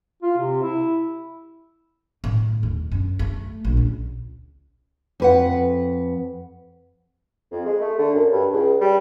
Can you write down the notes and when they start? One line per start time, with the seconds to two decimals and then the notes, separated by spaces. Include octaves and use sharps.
0.23 F4
0.38 C3
0.63 E4
2.24 A2
2.63 D#2
2.92 F#2
3.19 A3
3.65 A#1
3.77 C#2
5.20 F2 B4 F#5
7.52 F2
7.66 G#3
7.81 A3
7.98 D3
8.14 F#2
8.31 G2
8.53 C#2
8.81 G3